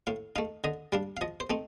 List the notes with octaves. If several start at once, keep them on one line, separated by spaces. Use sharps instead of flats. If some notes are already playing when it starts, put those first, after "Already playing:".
A2 F5
A3 D#4 F5
D3 D#5
G3 D4 F5
F5
F3 D#5
C5
A3 C4 D#4